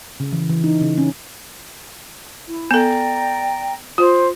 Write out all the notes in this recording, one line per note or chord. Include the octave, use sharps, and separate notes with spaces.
C#3
E3
E3
D#4
C#3
C#4
E4
B3 A4 D5 G5 A#5
F4 C5